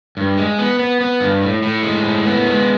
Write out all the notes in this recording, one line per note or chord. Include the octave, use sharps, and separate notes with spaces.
G2
G#3
B3
B3
B3
G2
A2
A2
G#3
A2
B3
G#3